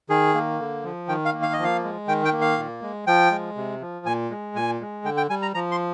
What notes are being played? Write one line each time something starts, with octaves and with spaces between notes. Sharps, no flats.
D#3 G#4
A#3
D3
F3
D#3 G5
F5
A#3
F5
D#5
F3
F5
G#3
D#3 G5
G5
A#3
F5
A#2
G#3
F3 G5
G#3
C3
F3
A#2 G#5
G#3
A#2 G#5
G#3
D3 G5
G5
G3 G#5
A#5
F3 A#5
C6